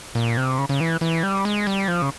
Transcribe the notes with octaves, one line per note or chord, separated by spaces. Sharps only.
A#2
C3
C#3
C#3
E3
E3
G3
G#3
G3
F3
C#3